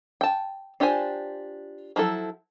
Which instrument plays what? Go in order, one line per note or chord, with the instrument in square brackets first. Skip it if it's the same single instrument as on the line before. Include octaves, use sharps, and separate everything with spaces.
[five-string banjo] G5 A5
D4 F4 G4 C5 G#5
F3 F#3 E4 A4